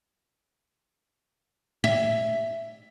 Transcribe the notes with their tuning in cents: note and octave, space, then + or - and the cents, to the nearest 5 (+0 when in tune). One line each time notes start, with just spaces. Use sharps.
E5 +10